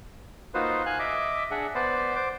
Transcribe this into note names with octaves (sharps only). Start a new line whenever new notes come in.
A#3 D#4 F4 F#4 B4 C5
F5 G#5 F#6
D#5 E5 D6
D4 G#4 E5 F#5
B3 B4 C5 D5
C5 D6